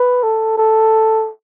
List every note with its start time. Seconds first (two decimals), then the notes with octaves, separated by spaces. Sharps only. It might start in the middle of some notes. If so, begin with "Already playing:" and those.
Already playing: B4
0.23 A4
0.57 A4